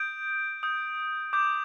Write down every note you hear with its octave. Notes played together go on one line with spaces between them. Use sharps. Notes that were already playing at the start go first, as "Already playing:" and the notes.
Already playing: D#6 G6 D7
D#6 G6
D6 G6